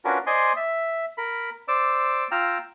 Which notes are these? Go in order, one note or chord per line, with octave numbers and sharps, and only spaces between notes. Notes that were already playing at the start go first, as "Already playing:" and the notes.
C#4 D4 F4 F#4 A#4 B4
C5 D5 D#5 G#5 C6
E5
A#4 B5
C5 D5 D6 E6
F4 G5 A#5 E6 F6